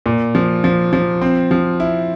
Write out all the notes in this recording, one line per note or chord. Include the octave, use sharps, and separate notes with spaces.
A#2
F3
F3
F3
C4
F3
E4